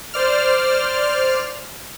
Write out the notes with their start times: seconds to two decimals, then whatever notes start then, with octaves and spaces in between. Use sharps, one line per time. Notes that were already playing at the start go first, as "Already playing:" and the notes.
0.14 C5 D5 F6